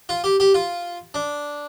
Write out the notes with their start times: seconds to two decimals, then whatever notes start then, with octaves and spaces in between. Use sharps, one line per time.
0.09 F4
0.24 G4
0.40 G4
0.54 F4
1.14 D4